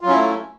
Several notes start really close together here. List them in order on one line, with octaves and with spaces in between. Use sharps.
F4 F#3 C#4 E4 A3